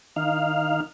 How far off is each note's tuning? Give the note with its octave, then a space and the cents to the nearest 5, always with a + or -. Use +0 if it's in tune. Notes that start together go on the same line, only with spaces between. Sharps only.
D#3 -10 D#4 +0 F5 +0